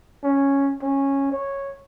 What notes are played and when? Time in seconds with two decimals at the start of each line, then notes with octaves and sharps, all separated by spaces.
0.24 C#4
0.82 C#4
1.32 C#5